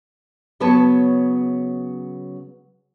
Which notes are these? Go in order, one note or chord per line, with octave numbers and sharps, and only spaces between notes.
C#3 F#3 B3 B4 C#5 A5